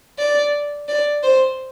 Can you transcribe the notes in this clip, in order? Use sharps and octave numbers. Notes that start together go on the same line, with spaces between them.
D5
D5
C5